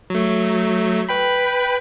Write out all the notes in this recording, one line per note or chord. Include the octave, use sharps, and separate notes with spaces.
F#3 A3
B4 G5 B5